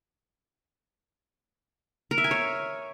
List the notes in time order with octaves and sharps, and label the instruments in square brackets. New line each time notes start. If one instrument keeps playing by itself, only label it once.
[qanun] A#4
E5
G#5
C#5